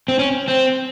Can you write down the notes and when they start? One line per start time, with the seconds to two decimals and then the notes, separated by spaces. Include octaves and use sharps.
0.08 C4
0.19 C#4
0.48 C4